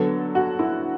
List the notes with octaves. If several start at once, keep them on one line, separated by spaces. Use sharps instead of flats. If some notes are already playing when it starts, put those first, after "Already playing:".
Already playing: D3 F#3 B3 A4
F#4
E4